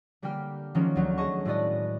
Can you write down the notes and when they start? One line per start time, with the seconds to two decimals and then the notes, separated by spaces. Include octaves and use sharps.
0.22 D3 G3 A#3 G4 G5 F6
0.75 D#3 F3 F#3 G#3 A#3 C#4
0.96 D2 F#3
1.18 G#4 D#5 A5 C#6
1.45 A2 G#3 F#4 B4 D5 D#5